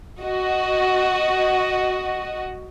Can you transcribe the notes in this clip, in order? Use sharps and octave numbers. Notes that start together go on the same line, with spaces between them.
F#4 D#5